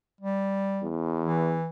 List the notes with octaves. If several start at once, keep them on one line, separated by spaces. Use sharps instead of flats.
G3
E2
E3